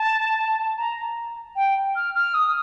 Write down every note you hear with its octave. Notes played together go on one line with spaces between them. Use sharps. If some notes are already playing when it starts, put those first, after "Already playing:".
Already playing: A5
A#5
G5
F6
F6
D#6